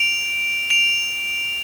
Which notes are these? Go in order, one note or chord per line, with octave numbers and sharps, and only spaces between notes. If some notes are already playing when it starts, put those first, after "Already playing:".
Already playing: D7 F7
D7 F7